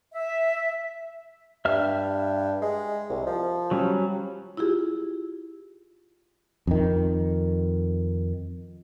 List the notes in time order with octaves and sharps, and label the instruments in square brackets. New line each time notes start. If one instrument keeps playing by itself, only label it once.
[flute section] E5
[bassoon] G2 [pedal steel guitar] E5 F6
[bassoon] G#3
C2
F3
[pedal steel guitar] F#3 G3 C#4
[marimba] E4 F4 G4 G#4
[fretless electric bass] F2 D#3